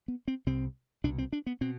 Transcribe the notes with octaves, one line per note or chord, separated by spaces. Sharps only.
B3
C4
C2 C3 C4
C2 B2 D4
C4
D4
B3
B2 C4